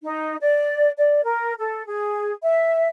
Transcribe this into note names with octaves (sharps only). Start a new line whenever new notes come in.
D#4
D5
D5
A#4
A4
G#4
E5